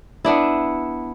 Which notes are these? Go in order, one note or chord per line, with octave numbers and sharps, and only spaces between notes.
B3 D4 E4